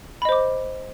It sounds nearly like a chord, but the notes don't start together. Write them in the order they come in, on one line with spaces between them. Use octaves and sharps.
B5 D#5 C5 D6